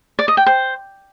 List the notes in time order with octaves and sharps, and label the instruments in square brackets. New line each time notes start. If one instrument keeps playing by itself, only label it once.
[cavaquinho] D5
D#5
G5
C5